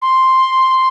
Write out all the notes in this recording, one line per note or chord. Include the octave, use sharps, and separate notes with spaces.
C6